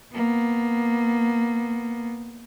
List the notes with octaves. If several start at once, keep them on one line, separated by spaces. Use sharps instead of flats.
A#3 B3